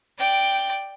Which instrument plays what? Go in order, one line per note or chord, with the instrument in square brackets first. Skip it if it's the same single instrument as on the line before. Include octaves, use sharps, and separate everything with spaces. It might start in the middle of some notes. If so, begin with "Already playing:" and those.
[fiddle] D5 G5